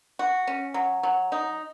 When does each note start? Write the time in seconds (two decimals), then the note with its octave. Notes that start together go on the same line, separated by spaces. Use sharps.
0.19 F#4
0.47 C#4
0.74 F#3
1.03 F#3
1.32 D#4